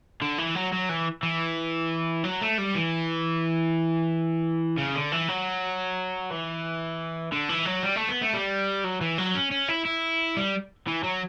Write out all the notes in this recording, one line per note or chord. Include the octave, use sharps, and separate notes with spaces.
D3
E3
F#3
F#3
E3
E3
F#3
A3
G3
E3
C#3
D3
E3
F#3
E3
D3
E3
F#3
G3
A3
B3
A3
G3
F#3
E3
F#3
C#4
C#4
E4
E4
G3
E3
F#3